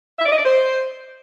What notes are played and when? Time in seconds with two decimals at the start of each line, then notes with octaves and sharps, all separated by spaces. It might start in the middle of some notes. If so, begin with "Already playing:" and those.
0.19 E5
0.25 D5
0.32 D#5
0.38 D5
0.45 C5